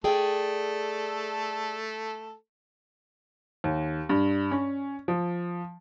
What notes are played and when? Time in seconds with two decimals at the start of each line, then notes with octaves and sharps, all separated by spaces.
0.04 A3 G#4 A4 D5 G5
3.64 D#2
4.09 G2
4.51 C#4
5.08 F3